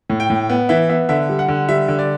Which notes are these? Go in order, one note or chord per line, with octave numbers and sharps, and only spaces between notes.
A2
G5
A2
B3
E3 E5
B3 E5
D3 E5
G3
F#5
D3
G3 E5
D3
D5